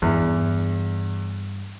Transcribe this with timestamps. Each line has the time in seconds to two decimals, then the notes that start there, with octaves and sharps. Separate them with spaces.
0.02 E2 G2